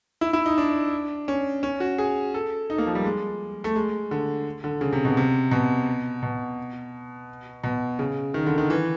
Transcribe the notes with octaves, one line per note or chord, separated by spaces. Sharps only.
E4
E4
D#4
D4
C#4
C#4
F#4
G#4
A4
D#4
A#3
F3
G3
G#3
A3
G#3
D3
D3
C#3
C3
B2
C3
B2
B2
B2
C#3
D#3
D3
D#3
E3